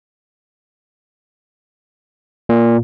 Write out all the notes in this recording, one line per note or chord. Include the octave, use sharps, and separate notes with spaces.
A#2